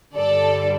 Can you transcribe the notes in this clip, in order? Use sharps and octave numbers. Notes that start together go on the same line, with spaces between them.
G2 D3 G3 A4 D5